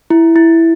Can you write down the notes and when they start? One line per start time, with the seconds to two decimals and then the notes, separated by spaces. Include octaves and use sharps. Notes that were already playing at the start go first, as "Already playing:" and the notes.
0.10 E4
0.36 E4